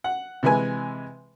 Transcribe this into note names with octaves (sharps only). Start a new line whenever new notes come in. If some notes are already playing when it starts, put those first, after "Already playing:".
F#5
C3 E3 G#3 B4 G#5